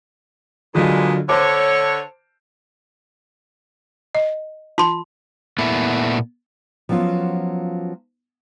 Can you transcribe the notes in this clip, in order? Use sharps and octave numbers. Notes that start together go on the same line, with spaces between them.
G2 A#2 D3 F#3 G#3 F4
D3 C5 C#5 A5 D6
D#5
F4 A5 C6
A#2 A3 B3 E4
F3 F#3 B3 C#4 F4